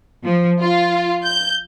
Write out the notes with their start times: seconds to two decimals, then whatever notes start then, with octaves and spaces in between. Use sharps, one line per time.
0.25 F3
0.60 F4
1.25 G6